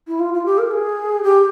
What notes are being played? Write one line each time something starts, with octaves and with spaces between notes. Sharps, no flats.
E4
F4
F4
G4
A#4
G#4
G4